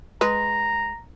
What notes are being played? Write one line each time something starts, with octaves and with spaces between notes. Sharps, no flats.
G#3 B4 A#5